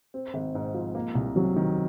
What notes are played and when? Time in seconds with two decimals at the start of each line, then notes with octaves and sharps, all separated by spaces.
0.14 C4
0.34 G#1
0.55 G#2
0.74 F3
0.95 A#3
1.15 C2
1.36 C3 F#3
1.56 D#3